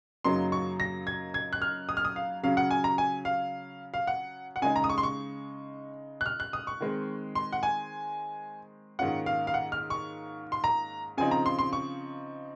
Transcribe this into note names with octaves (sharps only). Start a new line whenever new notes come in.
F#2 C#3 F#3 A#3 D#4 C6
C#6
A#6
G#6
G#6
F#6
F6
D#6
F6
D#6
F5
C#3 F#3 C#4 F5
F#5
G#5
A#5
G#5
F5
F5
F#5
F#5
C#3 G#3 D#4 G#5
A#5
D#6
C#6
C6
C#6
F#6
F6
F#6
D#6
C#6
D#3 G#3 C4
C6
F#5
G#5
G#2 D#3 A#3 C#4 F4 F#5
F5
F5
F#5
F6
C#6
C6
A#5
C#3 F3 C4 D#4 G#5
A#5
C6
C6
C#6